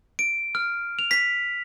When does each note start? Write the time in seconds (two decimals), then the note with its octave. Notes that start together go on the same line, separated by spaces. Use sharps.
0.19 D7
0.55 F6
0.99 F7
1.11 B6